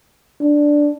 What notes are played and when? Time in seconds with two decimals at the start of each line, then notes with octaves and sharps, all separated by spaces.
0.41 D4